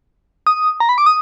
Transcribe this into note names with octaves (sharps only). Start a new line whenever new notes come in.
D#6
A#5
B5
D6
D#6